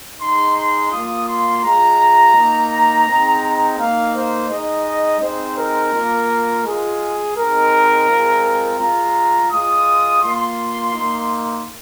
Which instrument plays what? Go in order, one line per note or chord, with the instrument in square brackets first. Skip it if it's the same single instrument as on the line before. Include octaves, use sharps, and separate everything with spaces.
[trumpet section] G#3 D#4 C6
C6
A#3 F4 D#6
C6
G#3 F4 A#5
A#3 D#4
G#3 C4 D#4
A#3 D#4 F5
C5
G#3 D#4 D#5
G#3 C4 D#4 C5
A#4
A#3 F4
G#3 F4 G#4
G#3 C4 D#4 A#4
G#3 C4 F4
G#3 F4 A#5
G#3 F4 D#6
A#3 F4 C6
A#3 D#4